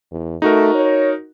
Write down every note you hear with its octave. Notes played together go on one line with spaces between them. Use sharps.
E2
A3 D#4 F#4 A#4
C#5